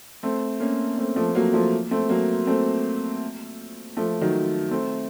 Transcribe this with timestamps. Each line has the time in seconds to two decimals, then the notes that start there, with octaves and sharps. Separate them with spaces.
0.23 A3 C4
0.60 A#3 C#4
0.97 A3 C4
1.16 F3 A3
1.35 F#3 A#3
1.53 F3 A3
1.91 A3 C4
2.09 F#3 A#3
2.47 A3 C4
3.97 F3 A3
4.21 D#3 F#3
4.71 A3 C4